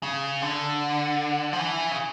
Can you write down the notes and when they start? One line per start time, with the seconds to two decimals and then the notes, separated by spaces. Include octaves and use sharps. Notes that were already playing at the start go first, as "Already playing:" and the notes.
0.03 C#3
0.42 D3
1.53 F3
1.59 E3
1.91 C#3